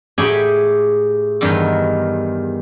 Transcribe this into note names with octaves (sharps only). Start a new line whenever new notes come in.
A2 G4 G#4 G5 G#5 B5
E2 G2 D#3